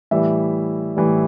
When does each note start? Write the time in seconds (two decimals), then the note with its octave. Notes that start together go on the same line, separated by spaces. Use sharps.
0.11 A2 E3 G3 E5
0.97 A2 E3 G3